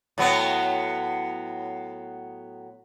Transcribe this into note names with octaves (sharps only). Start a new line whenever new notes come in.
A2 F#3 B3